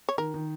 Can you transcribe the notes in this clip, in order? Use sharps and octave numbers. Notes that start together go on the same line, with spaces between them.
C#5
D#3 A#4
D#3